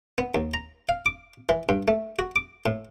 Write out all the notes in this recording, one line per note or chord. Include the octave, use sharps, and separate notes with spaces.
B3
D#2
A#5
F5
D6
E3
G2
A3
F#4
D6
A2